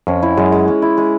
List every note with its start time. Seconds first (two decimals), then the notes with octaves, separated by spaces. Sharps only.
0.07 F2 C#4
0.22 E4
0.37 F#2 G#3
0.52 G#3
0.68 C#4
0.82 E4
0.97 G#3